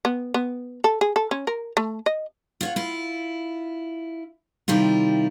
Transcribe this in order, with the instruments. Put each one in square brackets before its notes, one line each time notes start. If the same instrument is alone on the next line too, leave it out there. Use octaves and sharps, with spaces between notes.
[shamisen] B3
B3
A4
G#4
A4
C#4
A#4
A3
D#5
[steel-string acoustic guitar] F4 C#5 F#5
E4 F4
C3 D#3 G3 E4 F4